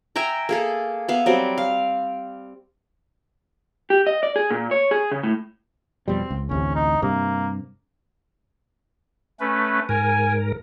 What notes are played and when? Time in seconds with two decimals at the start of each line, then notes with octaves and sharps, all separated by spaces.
0.16 E5 G5 G#5 A#5
0.49 A#3 G#4 A4
1.08 B3 E5 F5
1.26 F#3 G3 C4
1.58 F5
3.90 G4
4.07 D#5
4.23 D5
4.36 G#4
4.51 A#2
4.71 C#5
4.91 G#4
5.12 C#3
5.23 A2
6.08 F2 B2 G3 C4
6.30 C#2
6.49 A1 D2 C3 C#4
6.75 D#4
7.02 G2 C3 A#3
9.40 A3 C#4 B4
9.89 G#2 A#4 G#5